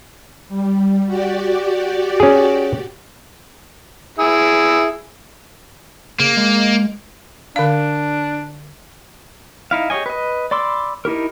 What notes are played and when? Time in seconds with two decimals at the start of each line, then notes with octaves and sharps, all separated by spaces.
0.49 G3
1.06 F#4 G4 D5
2.20 C#4 G#4
4.19 E4 G#4
6.19 C#3 A#3
6.37 G#3
7.56 D3 D4 F5
9.71 D#4 E4 F5
9.90 G4 G#4 C#5 D#5 G#5
10.06 B4 D#5
10.51 D5 B5 C6 D6 E6
11.05 D#4 E4 G4 A#4